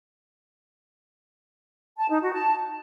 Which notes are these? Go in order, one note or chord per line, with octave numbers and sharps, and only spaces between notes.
A5
D#4
F#4
A5